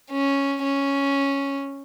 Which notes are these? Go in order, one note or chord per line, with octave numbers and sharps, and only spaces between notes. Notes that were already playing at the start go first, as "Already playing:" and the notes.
C#4
C#4